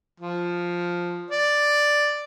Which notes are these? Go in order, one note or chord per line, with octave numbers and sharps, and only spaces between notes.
F3
D5